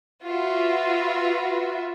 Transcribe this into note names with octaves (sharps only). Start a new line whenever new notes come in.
F4 F#4 B4 E5